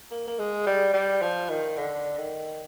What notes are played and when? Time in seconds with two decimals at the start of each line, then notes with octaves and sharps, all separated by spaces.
0.11 A#3
0.28 A#3
0.39 G#3
0.67 G3
0.94 G3
1.22 F3
1.49 D#3
1.77 D3
2.18 D#3